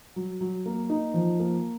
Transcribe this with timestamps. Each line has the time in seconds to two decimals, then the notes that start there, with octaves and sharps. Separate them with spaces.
0.16 F#3
0.41 F#3
0.66 A#3
0.90 D#4
1.14 F3
1.39 A#3